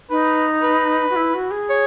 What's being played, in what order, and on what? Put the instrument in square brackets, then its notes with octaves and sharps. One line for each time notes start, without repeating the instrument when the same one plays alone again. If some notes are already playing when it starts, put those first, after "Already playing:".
[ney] D#4 [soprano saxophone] B4
[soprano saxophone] B4
[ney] F#4
E4
F#4
G#4
[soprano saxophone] C#5